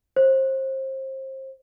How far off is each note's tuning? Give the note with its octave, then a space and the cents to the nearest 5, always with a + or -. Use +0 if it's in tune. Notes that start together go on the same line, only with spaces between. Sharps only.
C5 +30